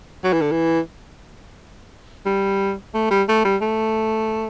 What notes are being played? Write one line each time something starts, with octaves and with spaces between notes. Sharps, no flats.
F#3
E3
D3
E3
G3
A3
G3
A3
G3
A3